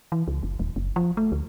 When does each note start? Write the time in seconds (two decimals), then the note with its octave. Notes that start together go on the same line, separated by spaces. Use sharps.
0.12 E3
0.27 C#2
0.43 F#1
0.59 D#1
0.76 F#1
0.96 F3
1.17 A3
1.32 D2